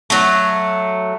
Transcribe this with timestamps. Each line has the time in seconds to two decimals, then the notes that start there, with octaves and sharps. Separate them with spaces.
0.10 F#3 A3